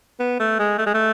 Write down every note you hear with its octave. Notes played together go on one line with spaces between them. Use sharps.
B3
A3
G#3
A3
G#3
A3